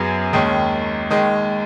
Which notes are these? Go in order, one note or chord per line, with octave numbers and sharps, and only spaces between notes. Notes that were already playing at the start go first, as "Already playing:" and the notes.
Already playing: F#2 F#3 B3 G#4
D#2 D#3 G#3 C#4
D#2 D#3 G#3